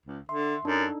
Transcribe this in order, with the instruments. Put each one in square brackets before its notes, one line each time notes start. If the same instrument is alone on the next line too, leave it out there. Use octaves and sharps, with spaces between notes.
[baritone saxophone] C#2
[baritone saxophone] D3 [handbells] E5 C6
[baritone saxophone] F#2 [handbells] D4 D#4 A4